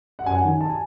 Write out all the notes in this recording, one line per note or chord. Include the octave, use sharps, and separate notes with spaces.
F#5
F#2 G#5
F#5
D#3 G#5
A5
G#5